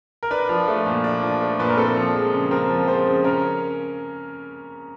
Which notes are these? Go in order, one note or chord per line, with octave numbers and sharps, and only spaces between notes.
A#4
D4 B4
F3
A3
A#2
D4
F3
A3
A#2 B4
A#4
C4 A4
F3
G#3
C#3
C4 A#4
F3
G#3 C5
C#3
C#4 A#4